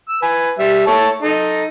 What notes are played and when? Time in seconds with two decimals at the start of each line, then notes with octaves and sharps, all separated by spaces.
0.09 E6
0.22 B4 G#5
0.59 G3 E5
0.87 A3 C#5 A5
1.22 D#4 A4